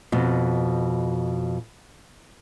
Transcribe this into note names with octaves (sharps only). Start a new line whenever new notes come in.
F2 B2